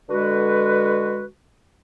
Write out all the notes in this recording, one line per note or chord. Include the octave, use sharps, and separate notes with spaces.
D3 G#3 F#4 B4